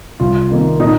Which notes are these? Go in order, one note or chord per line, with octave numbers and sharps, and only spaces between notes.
C2 F4
C3 D#3 A#3
A#2 D#4